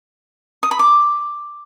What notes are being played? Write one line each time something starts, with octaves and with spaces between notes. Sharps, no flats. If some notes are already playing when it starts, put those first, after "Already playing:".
D#6
B5
D6